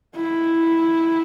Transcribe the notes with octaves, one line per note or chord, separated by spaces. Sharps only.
E4